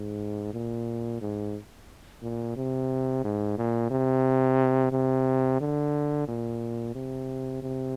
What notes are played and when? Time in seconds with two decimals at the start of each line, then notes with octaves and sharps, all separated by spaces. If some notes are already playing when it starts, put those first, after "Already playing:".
Already playing: G#2
0.54 A#2
1.21 G#2
2.23 A#2
2.56 C3
3.24 G#2
3.58 A#2
3.91 C3
4.92 C3
5.61 D3
6.28 A#2
6.95 C3
7.63 C3